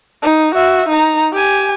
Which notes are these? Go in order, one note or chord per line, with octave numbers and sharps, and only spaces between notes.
D#4
F#4 E5
D#4 A#5
G4 G#5